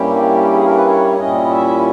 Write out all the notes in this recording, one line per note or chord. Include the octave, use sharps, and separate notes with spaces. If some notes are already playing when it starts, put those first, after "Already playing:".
Already playing: G2 G3 A#3 C#4 E4 G4
G#4
A#4
B4
C#5
A#2 G3 C#4 E4 D#5
E5